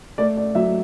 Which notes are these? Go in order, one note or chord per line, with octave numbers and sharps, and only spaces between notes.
A3 D5
D5
F#3 E5